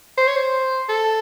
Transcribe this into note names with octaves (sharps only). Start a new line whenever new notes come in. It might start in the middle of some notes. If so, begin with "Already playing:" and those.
C5
C#5
C5
A4